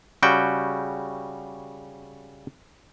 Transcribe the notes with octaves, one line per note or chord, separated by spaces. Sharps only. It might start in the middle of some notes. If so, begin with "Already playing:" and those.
C#3 G3 F#4 G5